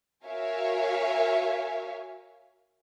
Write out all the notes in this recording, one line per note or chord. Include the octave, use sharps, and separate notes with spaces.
F#4 A#4 C#5 E5 F5 G#5